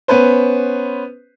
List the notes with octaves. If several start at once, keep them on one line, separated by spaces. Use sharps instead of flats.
B3 C#4 B4 C5